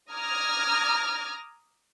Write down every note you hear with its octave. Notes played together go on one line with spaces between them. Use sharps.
A#5 D6 D#6 F6 G#6 A#6